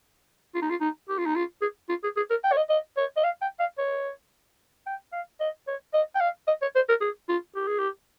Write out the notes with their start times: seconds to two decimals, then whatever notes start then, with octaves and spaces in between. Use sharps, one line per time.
0.55 F4
0.62 D#4
0.70 F4
0.81 D#4
1.09 G4
1.18 F4
1.26 D#4
1.36 F4
1.62 G#4
1.89 F4
2.03 G#4
2.17 G#4
2.30 A#4
2.44 G5
2.52 C#5
2.57 D#5
2.70 D#5
2.97 C#5
3.17 D#5
3.24 F5
3.42 G5
3.60 F5
3.78 C#5
4.87 G5
5.13 F5
5.40 D#5
5.68 C#5
5.94 D#5
6.15 G5
6.20 F5
6.47 D#5
6.62 C#5
6.75 C5
6.89 A#4
7.01 G#4
7.29 F4
7.56 G4
7.68 G#4
7.79 G4